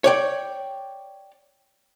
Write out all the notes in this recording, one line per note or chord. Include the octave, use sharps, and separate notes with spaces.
C#5 D5 G5